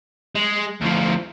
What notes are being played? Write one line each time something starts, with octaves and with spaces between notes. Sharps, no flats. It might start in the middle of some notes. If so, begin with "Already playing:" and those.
G#3
D2 F3